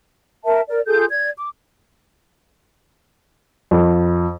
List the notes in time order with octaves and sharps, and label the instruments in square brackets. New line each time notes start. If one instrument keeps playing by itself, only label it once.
[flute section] A#4 E5 A5
A#4 D5
F4 G#4 A4 G6
D5 G#6
D6
[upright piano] F2